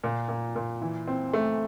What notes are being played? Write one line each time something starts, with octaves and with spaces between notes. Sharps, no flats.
A#2
A#2
A#2
E3
C4
A3